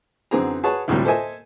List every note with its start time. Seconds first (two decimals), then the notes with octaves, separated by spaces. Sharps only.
0.31 F#2 D3 E3 C4 G#4 A#5
0.63 F#4 G#4 B4 C#5 A5
0.88 D2 A2 C3 F#3 G3
1.05 A4 C5 D#5 E5 G#5